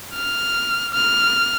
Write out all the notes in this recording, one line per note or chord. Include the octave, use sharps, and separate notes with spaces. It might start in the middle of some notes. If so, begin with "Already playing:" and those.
F6
F6